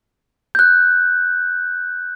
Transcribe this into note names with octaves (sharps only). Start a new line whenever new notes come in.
F#6 G6